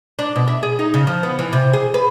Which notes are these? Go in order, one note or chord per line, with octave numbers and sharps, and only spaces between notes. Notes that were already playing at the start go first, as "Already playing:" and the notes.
D4
B2
E5
G#4
D#4
C#3
F3
B3
E3
C3
G#4
B4